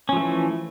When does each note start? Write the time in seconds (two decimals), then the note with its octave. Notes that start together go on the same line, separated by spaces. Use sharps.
0.09 C#4
0.13 F3
0.16 A3
0.20 E3